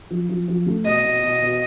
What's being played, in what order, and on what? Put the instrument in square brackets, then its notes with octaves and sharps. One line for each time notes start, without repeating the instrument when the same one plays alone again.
[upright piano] F3
F3
F3
A3
[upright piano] B2 [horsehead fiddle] D#5
[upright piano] B2
B2
B2